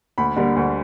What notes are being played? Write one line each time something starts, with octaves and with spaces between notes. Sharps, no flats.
D2 B5
D3 G3 A#3
D2